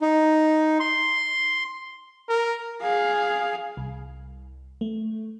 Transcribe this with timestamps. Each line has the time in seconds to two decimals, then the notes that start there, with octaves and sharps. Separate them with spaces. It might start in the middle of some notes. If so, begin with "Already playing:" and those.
0.01 D#4
0.80 C6
2.29 A#4
2.82 G#4 F5
3.77 C2
4.81 A3